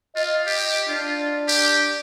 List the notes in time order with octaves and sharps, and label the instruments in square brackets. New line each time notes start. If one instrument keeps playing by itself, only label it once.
[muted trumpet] F4 [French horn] D#5
[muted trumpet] G4
[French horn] D4 [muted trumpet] F4
[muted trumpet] G4